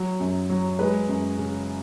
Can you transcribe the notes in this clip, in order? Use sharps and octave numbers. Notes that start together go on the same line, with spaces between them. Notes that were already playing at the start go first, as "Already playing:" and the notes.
Already playing: F#3
F#2
F#3
G#3 B4
F#2
C#3